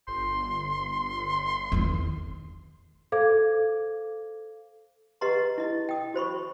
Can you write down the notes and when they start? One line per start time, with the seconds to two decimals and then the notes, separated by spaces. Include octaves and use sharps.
0.08 G1 C6
1.72 E2 D#3
3.12 A4 C5 F5 D6 G#6
5.21 G4 B4 D#5 F#5 A#5 C6
5.58 E4 D#5
5.89 G5 D#6
6.14 F#4 C5 B5 C#6